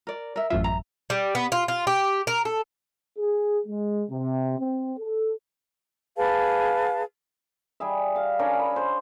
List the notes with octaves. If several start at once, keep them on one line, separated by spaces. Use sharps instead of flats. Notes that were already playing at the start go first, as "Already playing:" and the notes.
A#4 D5
A#4 E5
A1 F#2 F4 E5
A#5
G3
B3
F4
F4
G4
A#4
A4
G#4
G#3
C3
C4
A4
G#4 B4 F5 A5
G3 G#4 E5
F5
C#4 D4 A#4 C#5
B5
C5